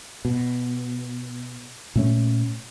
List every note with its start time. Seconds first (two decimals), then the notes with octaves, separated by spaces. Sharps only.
0.25 B2
1.96 A#2 A3 C#4